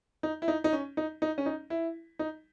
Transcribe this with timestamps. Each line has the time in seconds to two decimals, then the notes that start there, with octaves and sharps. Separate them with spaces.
0.23 D#4
0.42 E4
0.48 D#4
0.64 D#4
0.73 C#4
0.97 D#4
1.22 D#4
1.38 C#4
1.46 D#4
1.70 E4
2.19 D#4